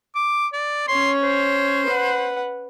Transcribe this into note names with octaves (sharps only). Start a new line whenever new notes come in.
D6
D5
C#4 C#5 C6
C5
B4 F#5